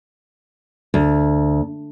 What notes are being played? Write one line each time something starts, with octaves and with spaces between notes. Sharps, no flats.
D2